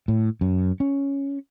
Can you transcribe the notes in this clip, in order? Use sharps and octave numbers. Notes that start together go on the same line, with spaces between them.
A2
F#2
C#4